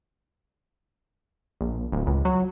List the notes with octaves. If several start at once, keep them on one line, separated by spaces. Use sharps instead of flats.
A#1
D1
C#2
F#3